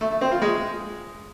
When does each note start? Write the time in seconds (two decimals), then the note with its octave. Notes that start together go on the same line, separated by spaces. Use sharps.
0.01 A3
0.11 A3
0.21 C4
0.31 F4
0.42 G#3